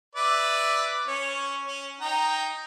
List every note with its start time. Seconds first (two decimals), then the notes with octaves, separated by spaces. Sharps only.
0.15 B4 D5 E5
1.07 C#4 C#5
1.67 C#4
2.01 D#4 G5 A#5